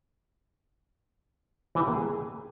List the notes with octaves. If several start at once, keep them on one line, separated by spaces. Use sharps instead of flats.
E3
G4
A#3
G#4